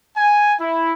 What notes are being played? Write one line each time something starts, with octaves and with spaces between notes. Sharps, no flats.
G#5
E4